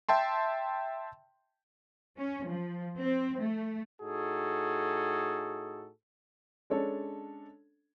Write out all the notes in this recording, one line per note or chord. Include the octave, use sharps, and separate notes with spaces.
E5 G5 A5 C6
C#4
F3
C4
A3
A2 D#4 F#4 G#4 A4
G#3 C#4 D4 A4 C#5